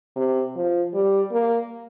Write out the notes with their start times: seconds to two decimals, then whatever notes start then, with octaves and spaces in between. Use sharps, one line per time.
0.16 C3
0.56 F3
0.94 G3
1.32 A#3